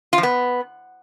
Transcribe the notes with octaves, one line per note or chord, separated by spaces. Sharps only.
F4
F3
B3